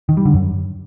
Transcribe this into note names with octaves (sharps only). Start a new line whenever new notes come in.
D#3
G3
D3
F#2